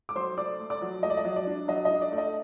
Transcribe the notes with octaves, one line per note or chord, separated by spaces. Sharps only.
D6
F#3 C5 C6
A3 D5 D6
A3
D5 D6
F#3
A3 D#5
D5
D#5
F#3
D5
D4
F#3 D#5
D#5
D4
D5
A3
D#5